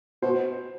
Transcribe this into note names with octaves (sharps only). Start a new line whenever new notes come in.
B2 C5